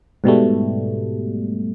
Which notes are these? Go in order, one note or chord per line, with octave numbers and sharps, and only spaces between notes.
G#2 B2 G3 A3